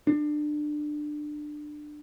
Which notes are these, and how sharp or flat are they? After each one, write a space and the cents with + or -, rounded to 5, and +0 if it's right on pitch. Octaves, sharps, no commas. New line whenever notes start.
D4 +25